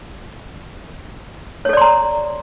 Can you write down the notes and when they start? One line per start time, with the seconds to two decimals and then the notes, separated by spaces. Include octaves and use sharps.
1.65 C#5
1.69 A4
1.73 D5
1.77 C6
1.81 A#5